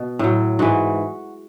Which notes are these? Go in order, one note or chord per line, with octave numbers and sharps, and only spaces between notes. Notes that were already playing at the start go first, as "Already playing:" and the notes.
Already playing: B2
A2 F#3
G#2 E3 F#4